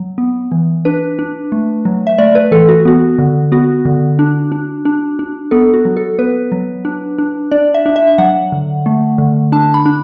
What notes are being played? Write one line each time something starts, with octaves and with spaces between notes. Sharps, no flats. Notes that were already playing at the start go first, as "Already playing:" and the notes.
Already playing: F#3
B3
E3
D4 B4
D4
A3
F#3
E5
A3 D5
B4
E3 A4
F#4
B3 F#4
D3
B3 F#4
D3
D4
D4
D4
D4
B3 A4
F#4
F#3
A4
B3 B4
F#3
D4
D4
D4 D5
E5
D4
E5
F#3 F#5
D3
A3
D3
D4 A5
B5
D4